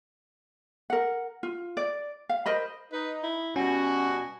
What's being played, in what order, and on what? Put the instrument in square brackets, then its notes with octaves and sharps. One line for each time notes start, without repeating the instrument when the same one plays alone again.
[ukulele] A#4 F#5
F4
D5
F5
A#4 C5 D#5 B5
[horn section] D#4 [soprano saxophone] B4
[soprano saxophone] E4
[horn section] B2 G3 F#4 [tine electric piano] C#4 [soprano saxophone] G#5